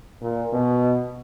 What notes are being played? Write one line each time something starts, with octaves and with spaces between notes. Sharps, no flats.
A#2
B2